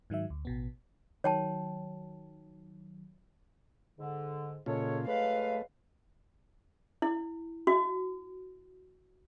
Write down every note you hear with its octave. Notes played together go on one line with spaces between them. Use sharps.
G#2 D#3 F#3 E5
D2
A1 B2 B3
D#3 F#3 C#5 G5 A5
G#2 D3
A#2 C#3 G#3 F4 A4 C#5
F#3 G#3 A3 B4 F5
E4
F#4